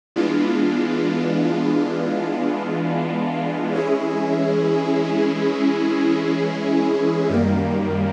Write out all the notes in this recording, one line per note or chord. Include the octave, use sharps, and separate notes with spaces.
E3 G#3 B3 D4 F4
E3 G#3 C#4 E4 G#4
F#2 D#3 G3 A#3